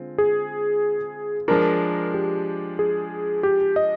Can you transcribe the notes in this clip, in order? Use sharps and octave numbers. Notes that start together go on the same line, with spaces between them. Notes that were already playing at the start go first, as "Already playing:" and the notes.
Already playing: D3 G#3 C4 F4
G#4
F3 G#3 D4 A#4
G4
G#4
G4
D#5